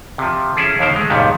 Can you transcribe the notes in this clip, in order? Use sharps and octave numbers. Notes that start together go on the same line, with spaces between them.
C3 F3
C#4 E4 G#4 A4
D#2 D3 D#3 B3 A#4 C5
G#3 A3
C#2 G2 A#2 D#3 G3 B3